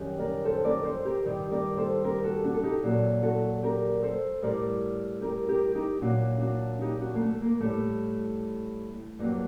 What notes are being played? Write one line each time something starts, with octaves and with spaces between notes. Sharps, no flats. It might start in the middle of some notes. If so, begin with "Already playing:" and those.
Already playing: F#2 D#3 G3
A#4 D5
A4 C5
A#4 D5
A4 C5
G4 A#4
G2 D#3 G3
A#4 D5
A4 C5
G4 A#4
F#4 A4
D4 F#4
A4
D#4 G4
A#2 F#3 F#4 A4
F#4 A4
G4 A#4
A4 C5
A2 G3 A#4 D5
G4 A#4
G4 A#4
D#4 G4
A#2 F#3 D4 F#4
D4 F#4
D#4 G4
D4 F#4
A#3
A3
A#3
A2 G3 A3
G2 F#3 A#3